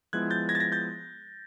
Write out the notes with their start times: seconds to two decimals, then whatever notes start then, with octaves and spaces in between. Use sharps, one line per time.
0.13 F3 G#3 B3 E4 F#6 G#6
0.30 G6 A6
0.49 G#6 A#6
0.55 A6
0.60 G#6 A#6
0.72 G6 A6